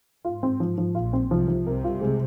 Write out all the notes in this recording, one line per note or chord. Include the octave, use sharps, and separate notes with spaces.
G#2 F4
C4
F3
F3
A#1 A#2 F4
C4
C2 C3 F3
F3
C2 C3 A#4
F4
G#3